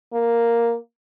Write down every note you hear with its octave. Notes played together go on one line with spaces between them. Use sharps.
A#3